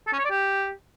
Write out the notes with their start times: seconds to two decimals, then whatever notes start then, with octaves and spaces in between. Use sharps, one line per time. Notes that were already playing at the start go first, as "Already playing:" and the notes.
0.07 A4
0.13 C#4
0.19 C#5
0.25 D5
0.30 G4